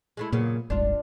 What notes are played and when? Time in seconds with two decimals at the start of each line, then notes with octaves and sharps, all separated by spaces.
0.17 G#3 A3 E4
0.32 F#2 A#2 C#3 B3
0.70 D#1 G#1 D4 F4